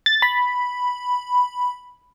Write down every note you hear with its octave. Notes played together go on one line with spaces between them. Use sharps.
A6
B5